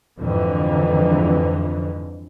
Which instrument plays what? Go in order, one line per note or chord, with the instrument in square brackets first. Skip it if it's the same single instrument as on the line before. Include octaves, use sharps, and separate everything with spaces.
[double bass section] F2 G#2 D3 E3